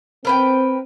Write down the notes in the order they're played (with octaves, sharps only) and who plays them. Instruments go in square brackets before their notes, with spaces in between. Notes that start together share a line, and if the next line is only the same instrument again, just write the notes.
[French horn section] C4 [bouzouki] A#4 B4 G5